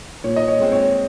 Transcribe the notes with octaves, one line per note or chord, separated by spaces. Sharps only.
A#2 C#5
D#5
C#5
G#3 C4
C#5